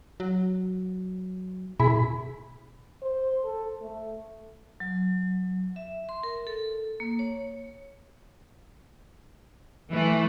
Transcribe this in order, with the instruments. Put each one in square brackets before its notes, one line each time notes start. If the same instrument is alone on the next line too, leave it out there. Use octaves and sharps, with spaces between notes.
[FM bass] F#3
[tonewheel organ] B2 G#4 B5 [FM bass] E4
[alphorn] C5
A4
A3
[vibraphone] F#3
E5
C6
A#4
A4
A#3
C#5
[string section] E3 [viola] A3